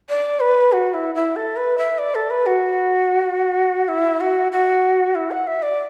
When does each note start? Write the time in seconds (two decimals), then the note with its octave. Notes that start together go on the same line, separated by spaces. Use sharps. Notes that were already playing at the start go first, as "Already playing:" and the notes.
0.09 D5
0.40 B4
0.72 F#4
0.94 E4
1.15 E4
1.36 A4
1.56 B4
1.78 E5
1.98 D5
2.15 A4
2.30 B4
2.46 F#4
3.88 E4
4.21 F#4
4.52 F#4
5.15 E4
5.31 F#5
5.47 E5
5.63 D5